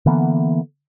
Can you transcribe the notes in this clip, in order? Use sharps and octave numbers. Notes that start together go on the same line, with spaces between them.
D3 E3 A#3 B3